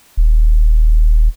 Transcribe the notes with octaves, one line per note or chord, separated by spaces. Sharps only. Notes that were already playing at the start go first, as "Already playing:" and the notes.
D#1